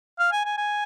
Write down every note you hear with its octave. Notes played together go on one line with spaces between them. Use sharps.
F5
G#5
G#5
G#5